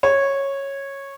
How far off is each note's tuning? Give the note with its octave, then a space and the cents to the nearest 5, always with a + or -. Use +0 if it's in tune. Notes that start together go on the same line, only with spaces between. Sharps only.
C#5 -10